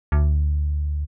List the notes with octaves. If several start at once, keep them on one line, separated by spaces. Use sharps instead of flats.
D2